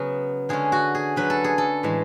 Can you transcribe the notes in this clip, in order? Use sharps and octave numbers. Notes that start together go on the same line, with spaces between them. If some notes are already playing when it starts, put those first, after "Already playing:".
Already playing: C#3 F#3 B3
D3 G#3 C#4 G#4
F#4
G#4
D3 F#3 C#4 B4
A4
G#4
A4
A2 E3 G#3